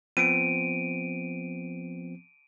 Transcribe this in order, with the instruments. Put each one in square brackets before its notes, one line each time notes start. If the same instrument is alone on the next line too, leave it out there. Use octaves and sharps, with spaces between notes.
[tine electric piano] F3 B3 C4 [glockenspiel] D7 D#7